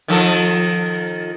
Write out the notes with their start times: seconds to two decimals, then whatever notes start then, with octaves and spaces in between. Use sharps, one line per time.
0.08 D#3 F3 A4